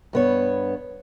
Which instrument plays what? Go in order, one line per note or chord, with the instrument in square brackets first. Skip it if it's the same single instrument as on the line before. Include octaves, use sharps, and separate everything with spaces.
[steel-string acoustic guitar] G2 B3 C#5